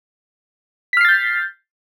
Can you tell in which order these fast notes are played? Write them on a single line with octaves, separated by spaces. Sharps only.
B6 F6 C7 A6 G6